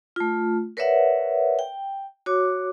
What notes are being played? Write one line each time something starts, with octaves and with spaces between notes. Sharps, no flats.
A3 F4
A#4 B4 C#5 D5 E5 F#5
G5
F#4 C#5 D6